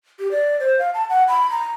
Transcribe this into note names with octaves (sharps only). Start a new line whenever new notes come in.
G4
D5
C5
F5
A5
F#5
B5
A#5